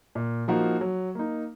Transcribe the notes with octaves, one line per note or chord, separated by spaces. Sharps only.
A#2
F3 A#3 D#4 F#4
F#3
A#3 D#4